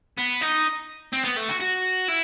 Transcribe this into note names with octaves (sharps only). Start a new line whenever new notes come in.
B3
D#4
C4
B3
A3
F#4
F#4
E4